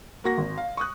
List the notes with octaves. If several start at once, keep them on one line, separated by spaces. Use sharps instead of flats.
A#3 F#4 A#6
G#1
F5
C#6 D#6 F#6